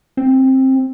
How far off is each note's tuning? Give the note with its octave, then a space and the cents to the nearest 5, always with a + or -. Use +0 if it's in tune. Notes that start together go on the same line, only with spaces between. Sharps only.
C4 +15